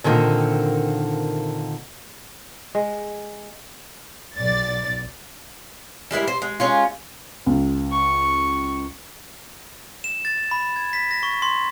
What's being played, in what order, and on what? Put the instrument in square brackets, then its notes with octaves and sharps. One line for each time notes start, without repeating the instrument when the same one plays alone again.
[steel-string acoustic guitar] A#2 D3 D#3 A#3 C4
[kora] G#3
[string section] B1 D5 A6
[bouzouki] G3 G#3 E4 A#4
C5
G#3
G#3 C#4 F4
[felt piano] C#2
[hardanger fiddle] C#6
[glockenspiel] E7
A6
B5
G#6
B6
A#6
C#6
C6